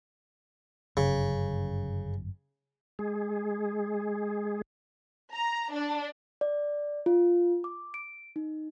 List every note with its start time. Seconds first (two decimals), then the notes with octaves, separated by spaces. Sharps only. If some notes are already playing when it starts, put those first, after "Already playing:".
0.97 G1 F#2 C#3
2.99 G#3 G#4
5.34 A#5
5.73 D4
6.41 D5
7.06 F4
7.64 D6
7.94 D7
8.36 D#4